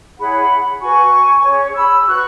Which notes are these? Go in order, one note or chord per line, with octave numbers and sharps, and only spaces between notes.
E4 G#4 C#5 F#5 B5
F#4 B4 G#5 C#6
C#4 G#4 C#5
B5 E6
F#4 B4 C#6 F#6